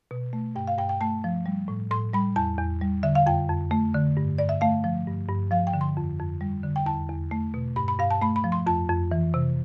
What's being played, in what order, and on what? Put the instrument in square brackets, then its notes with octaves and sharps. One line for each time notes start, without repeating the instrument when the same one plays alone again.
[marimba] B2
A3
G2 G5
F5
G2 G5
G5
A3 A5
F3
G3
A2
A2 C6
G3 B5
E2 A5
E2
G3
D3 E5
F5
F2 G5
F2
A3
D3
G2
G2 D5
E5
A3 F5
F3
G2
G2
F3 F5
G5
D3
C6
F2
F2
G3
D3
G5
E2 A5
E2
A3
B2
G2 B5
B5
G2 F5
A5
A3 B5
B5
F3
C6
F2 A5
F2
E3
C3